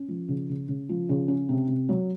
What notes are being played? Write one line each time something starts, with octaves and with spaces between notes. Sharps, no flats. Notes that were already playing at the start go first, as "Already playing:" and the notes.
Already playing: C#4
F3
C#3
C#3
C#3
F3
C#3
C#4
C3
C3
F#3